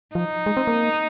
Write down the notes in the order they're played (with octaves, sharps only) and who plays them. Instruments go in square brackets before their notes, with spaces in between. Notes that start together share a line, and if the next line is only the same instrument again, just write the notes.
[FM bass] F3 [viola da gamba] D#4
[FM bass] G#3
C4
A#3